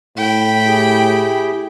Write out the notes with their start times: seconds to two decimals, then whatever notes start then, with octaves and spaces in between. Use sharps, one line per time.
0.18 A2 G5 B5
0.66 E4 G4 G#4